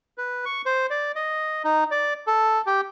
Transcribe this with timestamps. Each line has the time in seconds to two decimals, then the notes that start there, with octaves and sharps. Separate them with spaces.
0.18 B4
0.46 C#6
0.66 C5
0.90 D5
1.15 D#5
1.64 D#4
1.91 D5
2.27 A4
2.66 G4